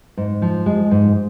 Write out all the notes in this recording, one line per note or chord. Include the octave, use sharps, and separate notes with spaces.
G#2
F3
G#3
G#2